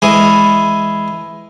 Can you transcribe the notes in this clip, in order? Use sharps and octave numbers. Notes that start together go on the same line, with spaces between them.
E3 G#3 G#4